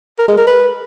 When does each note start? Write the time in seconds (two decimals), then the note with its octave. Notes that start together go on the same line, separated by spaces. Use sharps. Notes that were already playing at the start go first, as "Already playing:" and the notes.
0.19 A#4
0.28 G#3
0.38 A#4
0.47 B4